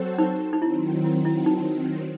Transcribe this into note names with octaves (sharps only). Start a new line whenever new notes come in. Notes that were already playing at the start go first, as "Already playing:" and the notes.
Already playing: F#3 C4 F#4 A4 C5
D#4
D#4
D#3 F#3 C4 E4
E4
E4
D#4